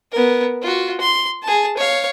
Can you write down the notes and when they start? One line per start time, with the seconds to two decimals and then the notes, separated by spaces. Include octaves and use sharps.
0.12 B3 A#4
0.62 F4 F#4
1.01 C6
1.43 G#4 A5
1.78 C#5 F5